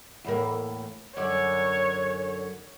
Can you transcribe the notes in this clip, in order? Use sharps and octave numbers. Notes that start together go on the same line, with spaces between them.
E2 A2 A#3
F#2 D3 C#5 D5